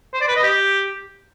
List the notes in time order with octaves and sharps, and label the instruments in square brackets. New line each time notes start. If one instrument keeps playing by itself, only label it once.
[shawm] C5
D5
B4
D#5
G4